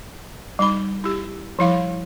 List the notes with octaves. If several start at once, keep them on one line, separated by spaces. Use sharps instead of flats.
G3 D#4 B5
E4 G4
F3 G3 E4 F5